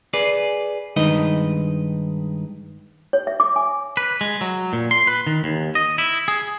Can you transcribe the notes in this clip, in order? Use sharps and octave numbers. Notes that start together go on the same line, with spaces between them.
G#4 B4 D5
G2 D#3 G#3 D#4 B4 D#5
C#5
E5
D6
G#5
B4
G#3
F#3
A#2
C6
B4
D#3
D#2
D#5
E4
G#4